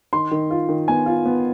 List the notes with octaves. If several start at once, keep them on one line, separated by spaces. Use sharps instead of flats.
D#3 C6
D#3
F4
D#3
B3 G#5
F4
B3